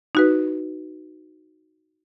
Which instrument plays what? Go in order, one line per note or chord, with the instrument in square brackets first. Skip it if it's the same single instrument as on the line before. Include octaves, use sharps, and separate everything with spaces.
[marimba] D#4 F#4 B4